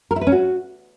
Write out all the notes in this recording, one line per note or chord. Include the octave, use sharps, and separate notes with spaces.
A#4
E4
B4
C#4
F#4